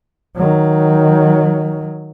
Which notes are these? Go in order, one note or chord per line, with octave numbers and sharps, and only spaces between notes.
D#3 F#3